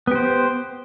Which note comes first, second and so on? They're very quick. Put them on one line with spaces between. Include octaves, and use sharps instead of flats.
B3 G4 C5